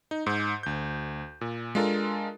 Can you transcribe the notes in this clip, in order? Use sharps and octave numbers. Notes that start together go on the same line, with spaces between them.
D#4
G#2
D2 G6
A#2
G#3 D4 F4 A4 A#4